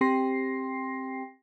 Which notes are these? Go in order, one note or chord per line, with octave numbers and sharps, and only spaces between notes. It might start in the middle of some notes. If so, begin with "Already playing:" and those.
C4 G4 G5 C6 A#6 C7